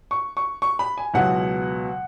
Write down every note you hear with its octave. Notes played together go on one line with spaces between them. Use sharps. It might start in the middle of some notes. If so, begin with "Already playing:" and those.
C#6
C#6
C#6
B5
G#5
C#2 B2 F#3 B3 E4 F#5